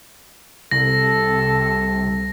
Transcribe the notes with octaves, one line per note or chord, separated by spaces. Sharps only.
C2 C3 A4 A#6